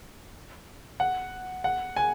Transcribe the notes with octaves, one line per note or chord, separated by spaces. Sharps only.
F#5
F#5
G#5